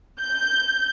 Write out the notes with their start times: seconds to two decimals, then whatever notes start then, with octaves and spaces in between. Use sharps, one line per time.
0.20 G6